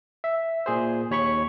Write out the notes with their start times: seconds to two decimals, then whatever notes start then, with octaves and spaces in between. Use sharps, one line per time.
0.24 E5
0.66 A#2 G#4 C5
1.11 D#2 C#5 B5 C#6